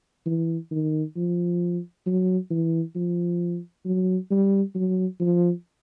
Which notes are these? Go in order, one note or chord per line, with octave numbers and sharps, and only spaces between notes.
E3
D#3
F3
F#3
E3
F3
F#3
G3
F#3
F3